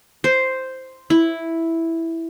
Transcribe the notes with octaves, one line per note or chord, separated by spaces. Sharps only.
C5
E4